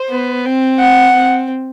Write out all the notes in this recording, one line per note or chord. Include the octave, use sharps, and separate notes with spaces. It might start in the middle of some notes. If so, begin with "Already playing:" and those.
Already playing: C5
B3
C4
F#5
C4